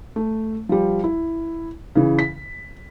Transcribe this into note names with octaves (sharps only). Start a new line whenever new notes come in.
A3
F3 G3
E4
C#3 E3
B6